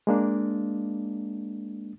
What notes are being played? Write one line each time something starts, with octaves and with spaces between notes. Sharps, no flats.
G#3 A#3 D4